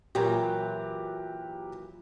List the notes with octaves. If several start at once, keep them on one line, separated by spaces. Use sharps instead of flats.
A#2 E3 F#3 G4 A#4